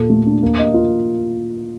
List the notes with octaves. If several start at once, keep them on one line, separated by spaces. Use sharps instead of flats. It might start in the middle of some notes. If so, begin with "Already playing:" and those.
Already playing: A#2 A4
A3
D4
A#3
D#5
F4